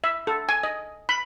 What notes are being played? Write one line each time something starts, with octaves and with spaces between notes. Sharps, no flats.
E5
A4
G#5
D#5
B5